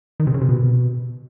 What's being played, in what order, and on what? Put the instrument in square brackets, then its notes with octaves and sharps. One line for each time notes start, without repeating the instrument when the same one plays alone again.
[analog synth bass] D#3
C3
C#3
C3
B2